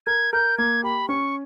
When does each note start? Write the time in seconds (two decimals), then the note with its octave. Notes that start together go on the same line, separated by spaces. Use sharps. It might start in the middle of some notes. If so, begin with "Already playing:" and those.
0.06 A#4 G#6
0.33 A#4 G6
0.58 A#3 G#6
0.83 G4 B5
1.09 C#4 C#6